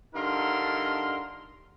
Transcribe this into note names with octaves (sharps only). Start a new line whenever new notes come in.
G2 D3 D#4 F4 A#4 C6